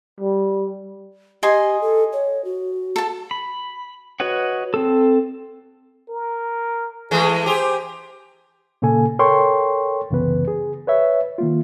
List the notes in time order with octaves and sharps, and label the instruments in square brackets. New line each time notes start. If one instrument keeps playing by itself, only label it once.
[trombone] G3
[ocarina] G4 [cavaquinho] D#5 G#5 C6
[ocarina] A4
C#5
F#4
[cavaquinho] A4 A5
[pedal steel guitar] B5
F#4 B4 C#5 D#5 F#5
C4 A4
[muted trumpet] A#4
[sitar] E3 G#3 A3 [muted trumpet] G#4
[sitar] G4 G#4 [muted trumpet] C5
[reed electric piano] A#2 C#3 A#3 A4 G#5
A4 A#4 C#5 G5 C6 C#6
C2 F#2 C#3 E3 B3 B4
G#4
B4 C#5 E5
D#3 A#3 F4